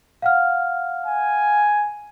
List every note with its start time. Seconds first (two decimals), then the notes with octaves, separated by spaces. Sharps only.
0.22 F5 F#5 F6
1.06 G#5